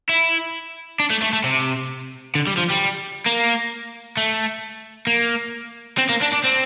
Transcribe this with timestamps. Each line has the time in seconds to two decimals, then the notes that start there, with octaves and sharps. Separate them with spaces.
0.09 E4
1.00 D4
1.10 A3
1.22 A3
1.33 A3
1.44 C3
2.35 D3
2.47 G3
2.58 F3
2.70 G3
3.26 A#3
4.17 A3
5.07 A#3
5.98 C4
6.09 A#3
6.21 D4
6.32 D4
6.44 C4